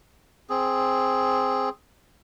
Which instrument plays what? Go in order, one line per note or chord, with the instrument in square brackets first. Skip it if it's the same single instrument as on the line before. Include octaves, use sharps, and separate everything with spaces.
[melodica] C4 G#4